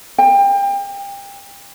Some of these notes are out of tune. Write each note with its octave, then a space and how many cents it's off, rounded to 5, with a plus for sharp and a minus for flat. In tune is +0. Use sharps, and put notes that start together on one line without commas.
G5 +30